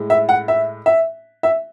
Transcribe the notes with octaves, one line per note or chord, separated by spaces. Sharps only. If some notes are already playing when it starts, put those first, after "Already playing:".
Already playing: A2 G#3
E5
F#5
E5
E5
E5